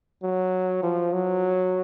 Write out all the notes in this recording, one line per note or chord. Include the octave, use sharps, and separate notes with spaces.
F#3
F3
F#3